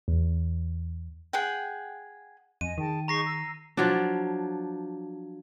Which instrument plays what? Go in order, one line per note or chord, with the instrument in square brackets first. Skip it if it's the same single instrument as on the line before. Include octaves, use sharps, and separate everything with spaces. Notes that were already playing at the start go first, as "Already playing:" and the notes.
[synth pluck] E2
[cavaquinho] G#4 F#5 G5
[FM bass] F2 [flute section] D#5 G#5 [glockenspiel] D#7
[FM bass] D#3 [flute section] G#4 G5 A5
[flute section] D#4 G#4 C#6 [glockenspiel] A#5 A#6 C7
[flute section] E6
[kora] F3 F#3 D4